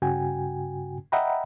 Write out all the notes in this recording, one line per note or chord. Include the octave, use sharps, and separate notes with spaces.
G2 C#3 F#4 G5 G#5
D#5 E5 F#5 G5 A#5 B5